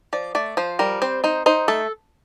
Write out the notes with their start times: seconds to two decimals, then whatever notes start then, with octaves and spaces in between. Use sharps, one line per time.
0.13 F3 D5
0.35 A3 D5
0.57 F3 C5
0.79 G3 A#4
1.02 C4 C5
1.24 D#4 C5
1.46 D#4 C5
1.68 A3 A4